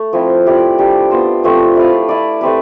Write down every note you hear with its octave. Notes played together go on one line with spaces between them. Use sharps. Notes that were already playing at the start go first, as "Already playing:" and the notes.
Already playing: A3
F3 C4 E4
E4 G4 D5
G3 D4 G4
B3 F4 C5
F3 A3 C4
E4 B4 D5 F5
E4 B4 D5
A3 C4 G4 B4